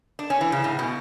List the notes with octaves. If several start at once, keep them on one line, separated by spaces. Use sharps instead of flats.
D4
C#4
E3
C#3
A2
B2